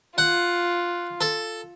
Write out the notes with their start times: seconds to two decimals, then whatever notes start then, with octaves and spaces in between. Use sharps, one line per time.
0.18 F4 F#5
1.21 A4